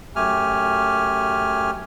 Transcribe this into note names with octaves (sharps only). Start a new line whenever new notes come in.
F#2 A3 G4 G#5 F6